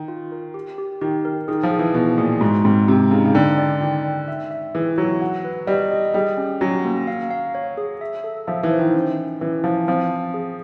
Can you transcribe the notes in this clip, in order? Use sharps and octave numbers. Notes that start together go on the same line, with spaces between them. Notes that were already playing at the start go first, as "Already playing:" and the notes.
Already playing: D#3
F4
A#4
G4
G4
D#3 G4
A#4
D#3 G#4
F3
G#4
E3
B2 G#4
A#2 G#4
G#2 F#4
G#2 C4
C3 C4
C#3 D#4
C#3
D3 G5
D5
D#3 G5
D5
E5
E5
E3 G#4
F#3 C#5
F#5
B4
G3 D#5
D#5
G3 G#4
C#4
F#3 C#4
A#3
F5
F5
C#5
G#4
E5
A4
F3 E5
E3
C5
D#3
C#4
E4
E3 C#4
F3 E4
F3 C4
C4
G#4